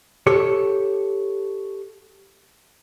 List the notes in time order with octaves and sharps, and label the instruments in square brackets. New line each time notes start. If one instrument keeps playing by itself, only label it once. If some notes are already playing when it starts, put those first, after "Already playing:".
[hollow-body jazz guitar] G4 A4 C#5